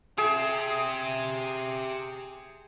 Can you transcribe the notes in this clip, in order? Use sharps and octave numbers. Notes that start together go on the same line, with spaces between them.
G4 G#4 E5